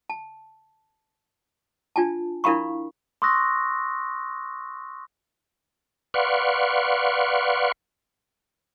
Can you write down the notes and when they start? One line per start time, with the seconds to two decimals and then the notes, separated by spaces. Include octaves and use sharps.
0.10 A5
1.96 D4 F4 G#5 A5
2.44 D4 E4 A#4 F5 B5 C#6
3.22 C6 C#6 D#6 E6 F#6 A#6
6.14 B4 D5 F5 F#5 C6 C#6